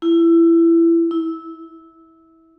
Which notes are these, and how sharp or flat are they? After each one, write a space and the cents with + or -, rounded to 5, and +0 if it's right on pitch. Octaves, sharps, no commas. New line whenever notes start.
E4 +20
E4 -20